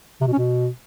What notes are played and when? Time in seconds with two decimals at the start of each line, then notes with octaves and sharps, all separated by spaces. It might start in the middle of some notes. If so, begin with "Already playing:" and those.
0.21 C3
0.27 B2
0.33 C#4
0.38 B2